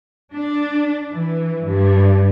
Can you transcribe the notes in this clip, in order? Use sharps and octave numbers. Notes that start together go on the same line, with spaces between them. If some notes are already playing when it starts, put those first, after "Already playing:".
D4
E3
G2